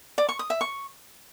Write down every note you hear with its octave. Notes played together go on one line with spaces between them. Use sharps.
D5
C#6
D#6
E5
C#6